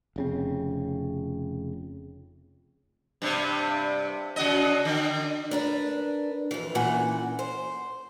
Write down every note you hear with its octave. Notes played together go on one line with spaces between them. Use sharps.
F1 C#3 C4
G2 C3
C#3 F#4 D#5
D3
D4 A#4 B4
F2 E3
A#2 D3 E3 C#4 F#5
C5